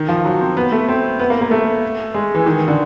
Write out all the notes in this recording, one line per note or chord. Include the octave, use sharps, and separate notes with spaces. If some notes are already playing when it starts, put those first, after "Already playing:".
Already playing: D#3
F3
F#3
C4
B3
A3
C4
B3
A#3
A#3
A3
G#3
E3
D#3
D3